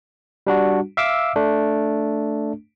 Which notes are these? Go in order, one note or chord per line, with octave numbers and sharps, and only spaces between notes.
G3 D4 F#4
E5 F5 D6 E6
A3 D4